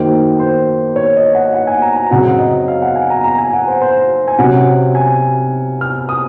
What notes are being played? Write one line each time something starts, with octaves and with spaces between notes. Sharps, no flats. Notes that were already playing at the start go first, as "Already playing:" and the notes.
Already playing: F#2 D#3 A#3 C5
C5
C#5
D#5
F#5
F#5
G#5
A#5
A#5
F#2 C#3 F#3 C4 F#5
D#5
F5
F#5
G#5
A#5
A#5
G#5
F#5
C5
C5
G#5
C3 F#3 C#4 F#5
G#5
F6
D#6